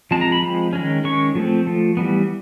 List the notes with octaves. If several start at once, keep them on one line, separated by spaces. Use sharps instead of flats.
F3 G#3 C4 A5
A#5
B5
F3 G#3 C4
D#3 G#3 C#4
D#3 G#3 C#4 C#6
F3 A3 C4
F3 A3
E3 G3 B3